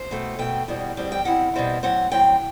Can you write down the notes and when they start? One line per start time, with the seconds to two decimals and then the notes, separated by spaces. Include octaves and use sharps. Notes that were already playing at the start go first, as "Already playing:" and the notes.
Already playing: C5
0.11 B2 A3 C4
0.39 B2 A3 C4 G5
0.68 E2 B2 G3 C4
0.97 E2 B2 G3 C4
1.12 G5
1.25 B2 G3 C4 E4 F#5
1.54 B2 G3 C4 E4
1.83 A2 F#3 C4 F#5
2.11 A2 F#3 C4 G5